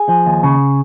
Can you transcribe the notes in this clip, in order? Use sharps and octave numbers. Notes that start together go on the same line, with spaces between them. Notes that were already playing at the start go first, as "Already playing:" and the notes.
Already playing: G#4
F3
D#2
C#3